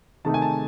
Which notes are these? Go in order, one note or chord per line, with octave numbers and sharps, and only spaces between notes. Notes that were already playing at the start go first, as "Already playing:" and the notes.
C3 D#3 A3 D#4 A5
G#5
A5